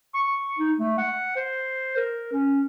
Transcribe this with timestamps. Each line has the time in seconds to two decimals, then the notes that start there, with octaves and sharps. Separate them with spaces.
0.14 C#6
0.59 D#4
0.79 A3
0.98 F#5
1.36 C5
1.96 A#4
2.33 C#4